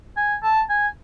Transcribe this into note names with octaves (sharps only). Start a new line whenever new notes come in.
G#5
A5
G#5